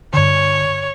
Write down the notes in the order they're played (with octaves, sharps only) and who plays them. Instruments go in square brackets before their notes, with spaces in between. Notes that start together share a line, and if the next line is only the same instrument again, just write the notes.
[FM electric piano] G2 D3 [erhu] C#5